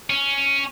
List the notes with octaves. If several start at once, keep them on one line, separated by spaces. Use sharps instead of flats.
C#4